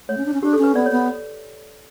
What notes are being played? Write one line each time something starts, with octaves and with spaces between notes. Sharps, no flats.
A3 C#5
C#4
D4
C#4
D4 G4
A4
C#4
B4
B3 D5
C#5
B3